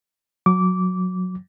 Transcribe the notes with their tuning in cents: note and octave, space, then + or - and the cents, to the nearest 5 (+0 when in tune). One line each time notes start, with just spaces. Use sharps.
F#3 -15 D6 -15